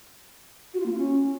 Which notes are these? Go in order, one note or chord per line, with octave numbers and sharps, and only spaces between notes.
F#4
F4
A#3
F4
C#4